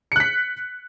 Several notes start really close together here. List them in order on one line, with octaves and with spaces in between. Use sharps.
C#7 F#6 B6